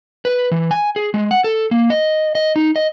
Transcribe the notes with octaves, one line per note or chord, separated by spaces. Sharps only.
B4
E3
G#5
G#4
G#3
F#5
A4
A#3
D#5
D#5
D#4
D#5